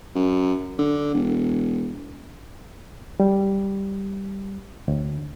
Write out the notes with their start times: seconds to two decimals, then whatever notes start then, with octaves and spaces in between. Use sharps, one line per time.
0.15 F#2
0.78 D3
1.14 E1
3.20 G3
4.88 D2